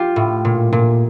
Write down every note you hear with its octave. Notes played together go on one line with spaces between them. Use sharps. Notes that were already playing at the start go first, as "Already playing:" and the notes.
Already playing: F4 G4
A2
A#2
A#2